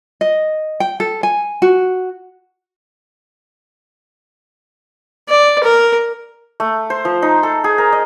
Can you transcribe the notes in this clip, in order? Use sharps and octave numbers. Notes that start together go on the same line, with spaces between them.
D#5
G5
A4
G#5
F#4
D5
A#4
A3
C5
F3
D#4
A4
G#4
A#4
D#5